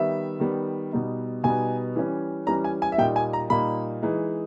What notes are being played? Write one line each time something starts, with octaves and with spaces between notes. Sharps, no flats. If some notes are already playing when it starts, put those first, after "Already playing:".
Already playing: D#3 G3 B3 E5
D#3 G3 B3
B2 G3 B3 D#4
B2 G3 B3 D#4 G#5
E3 G3 C#4
E3 G3 C#4 A#5
G#5
G#5
E5
A#2 G3 A#3 D#4 G5
G#5
A#5
A#2 G3 A#3 D#4 B5
E3 G#3 D#4